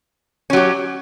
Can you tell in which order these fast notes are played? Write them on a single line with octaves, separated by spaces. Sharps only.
C#4 F#3 G4